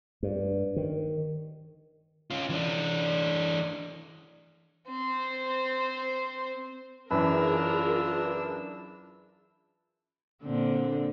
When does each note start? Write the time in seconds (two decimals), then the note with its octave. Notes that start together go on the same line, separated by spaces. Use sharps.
0.23 G2
0.76 D#3
2.31 C#4 F4
2.49 E3 D4
4.89 C4 C5
7.11 F#2 E3 D4 F4 G#4 A#4 B4 E6
10.43 A#2 D3 C4